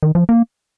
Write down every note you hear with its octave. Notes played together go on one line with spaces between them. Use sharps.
D#3
F3
A#3